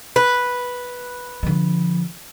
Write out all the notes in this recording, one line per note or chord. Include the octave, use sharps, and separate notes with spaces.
B4
D3 F3